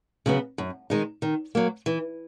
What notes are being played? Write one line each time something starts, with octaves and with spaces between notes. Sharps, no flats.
C#3 F#3 B3
F#2
D#3 G#3 D#4
D#3
F#3 A#3
E3